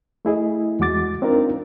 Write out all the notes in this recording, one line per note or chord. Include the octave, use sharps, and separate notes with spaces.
A3 E4 G#4 D#5
E2 G#3 F#4 D6 A6
C4 D4 D#4 F4 A#4